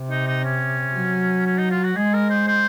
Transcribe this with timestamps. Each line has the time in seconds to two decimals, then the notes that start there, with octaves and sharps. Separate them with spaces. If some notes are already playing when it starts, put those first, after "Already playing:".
Already playing: C3
0.10 D#4
0.27 D#4
0.44 C#4
0.95 F#3
1.46 C#4
1.58 D#4
1.70 F4
1.83 F#4
1.96 G#3 G#4
2.14 A#4
2.30 C5
2.47 C5